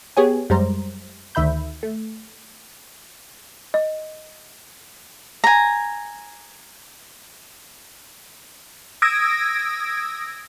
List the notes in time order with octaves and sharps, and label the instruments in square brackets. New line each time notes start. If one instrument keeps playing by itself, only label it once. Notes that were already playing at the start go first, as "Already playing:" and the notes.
[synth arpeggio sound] B3 G4 G#4 C#5 G#5
F#2 G3 G#3 C5 A#5
D2 D#3 E5 B5 G6
A3
[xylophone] D#5
[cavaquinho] G#5 A#5
[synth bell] D#6 E6 G#6 A#6 D7